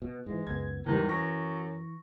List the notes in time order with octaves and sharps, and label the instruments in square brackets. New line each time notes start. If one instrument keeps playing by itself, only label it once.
[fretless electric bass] B2
[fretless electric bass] G#2 E3 [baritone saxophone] G#3
[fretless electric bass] C#2 F#2 B3 [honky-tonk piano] G#6
[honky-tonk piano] E2 G#2 G3 [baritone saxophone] D#3 [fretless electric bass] E3
[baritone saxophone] F#2 [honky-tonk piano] C#6 A#6